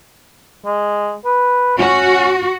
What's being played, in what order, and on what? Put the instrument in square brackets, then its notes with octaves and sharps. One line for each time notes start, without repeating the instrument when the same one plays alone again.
[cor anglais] G#3
B4
[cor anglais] C#4 [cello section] F#4